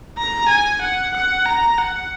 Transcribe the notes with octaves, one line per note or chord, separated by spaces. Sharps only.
A#5
G#5
F#5
F#5
A#5
F#5